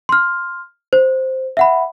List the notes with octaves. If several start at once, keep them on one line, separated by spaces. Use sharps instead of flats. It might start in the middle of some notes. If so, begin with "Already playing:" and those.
C6 F6
C5
E5 F#5 B5